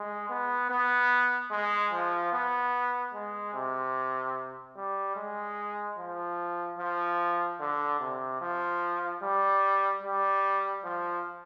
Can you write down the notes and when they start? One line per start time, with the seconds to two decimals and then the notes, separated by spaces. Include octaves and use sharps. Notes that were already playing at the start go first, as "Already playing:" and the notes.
Already playing: G#3
0.30 B3
0.70 B3
1.51 G#3
1.93 F3
2.33 B3
3.14 G#3
3.54 C3
4.76 G3
5.16 G#3
5.98 F3
6.79 F3
7.60 D3
8.00 C3
8.41 F3
9.23 G3
10.03 G3
10.84 F3